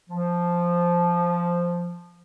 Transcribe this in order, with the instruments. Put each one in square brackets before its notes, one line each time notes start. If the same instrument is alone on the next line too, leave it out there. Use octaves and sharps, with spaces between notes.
[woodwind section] F3